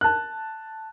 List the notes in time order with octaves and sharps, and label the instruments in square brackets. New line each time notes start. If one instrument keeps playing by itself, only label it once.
[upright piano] A5 F#6